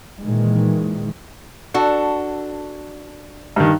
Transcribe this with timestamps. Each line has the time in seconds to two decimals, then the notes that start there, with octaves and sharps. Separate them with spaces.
0.23 A#2 D#3 E3 G#3
1.74 D4 F#4 A4
3.56 G2 D#3